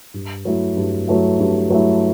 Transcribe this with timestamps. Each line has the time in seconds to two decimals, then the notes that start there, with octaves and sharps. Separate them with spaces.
0.14 G2
0.45 F#3 A3 E4
0.77 G2
1.08 F#3 A3 E4
1.39 G2
1.70 F#3 A3 E4